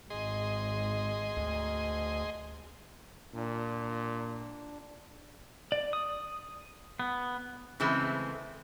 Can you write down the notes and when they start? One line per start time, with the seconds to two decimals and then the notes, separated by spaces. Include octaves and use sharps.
0.10 G#1 G#4 D#5 C6
1.37 D2
3.34 A#2 D4
5.72 D5
5.93 D#6
7.00 B3
7.80 C#3 E3 G#3 A3 C4